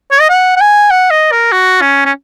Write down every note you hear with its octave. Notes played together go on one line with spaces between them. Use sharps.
C#5
D#5
F#5
F#5
G#5
F#5
D#5
A#4
F#4
C#4
C#4